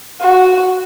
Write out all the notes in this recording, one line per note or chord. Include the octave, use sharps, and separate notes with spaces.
F#4